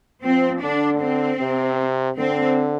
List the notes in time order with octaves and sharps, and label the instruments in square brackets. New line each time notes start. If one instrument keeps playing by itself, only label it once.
[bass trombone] F3 [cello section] C4
[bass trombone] D3 [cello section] D4
[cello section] C4
[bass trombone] C3
[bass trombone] D3 [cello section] C4